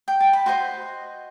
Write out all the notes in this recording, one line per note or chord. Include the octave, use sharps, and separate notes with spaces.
G5
A5
B5
F#4 C5 D#5 C6